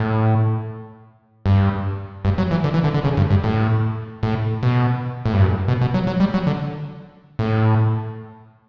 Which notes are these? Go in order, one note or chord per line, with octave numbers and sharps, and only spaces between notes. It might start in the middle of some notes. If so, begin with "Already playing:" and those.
Already playing: A2
G2
G2
F#3
E3
D3
E3
D3
D3
C#3
G2
G2
A2
A2
B2
A2
G2
F#2
B2
B2
F#3
F#3
G3
F#3
D3
A2